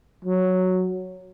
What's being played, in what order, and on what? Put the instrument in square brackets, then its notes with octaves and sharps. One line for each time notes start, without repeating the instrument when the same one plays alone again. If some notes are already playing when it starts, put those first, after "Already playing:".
[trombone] F#3